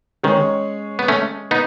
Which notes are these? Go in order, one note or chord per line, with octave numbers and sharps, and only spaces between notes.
D#3 G#3 C#4 G#4 C#5
B3
A3 C#4
B3 D#4